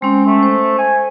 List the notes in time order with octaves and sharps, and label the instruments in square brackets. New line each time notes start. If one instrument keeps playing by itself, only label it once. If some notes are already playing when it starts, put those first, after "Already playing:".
[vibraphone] G#3 C#4 [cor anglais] C4
[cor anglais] A3
[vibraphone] C5
[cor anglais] G#5